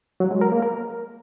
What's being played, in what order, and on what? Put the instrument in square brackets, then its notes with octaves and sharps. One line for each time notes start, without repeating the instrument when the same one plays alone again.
[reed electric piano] F#3
G#3
A#4
A#3
A#4